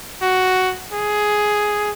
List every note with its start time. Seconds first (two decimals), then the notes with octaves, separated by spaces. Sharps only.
0.22 F#4
0.92 G#4